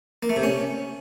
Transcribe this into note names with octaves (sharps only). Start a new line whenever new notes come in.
A#3
A3
C3
C#4